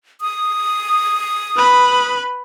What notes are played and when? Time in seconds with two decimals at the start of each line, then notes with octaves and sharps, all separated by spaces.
0.21 D#6
1.56 B4 B5